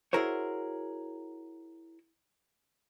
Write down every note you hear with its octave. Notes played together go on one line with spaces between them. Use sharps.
E4 F#4 G#4 A#4 C5 C#5